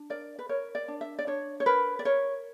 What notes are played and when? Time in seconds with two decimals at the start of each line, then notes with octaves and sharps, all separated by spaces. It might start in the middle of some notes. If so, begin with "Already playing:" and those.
Already playing: D4
0.10 A#4 D5
0.39 B4
0.49 A#4 C#5
0.75 D5
0.88 D4
1.01 E5
1.19 D5
1.27 D4 C#5
1.60 C#5
1.66 A#4 B4
1.99 D5
2.05 A#4 C#5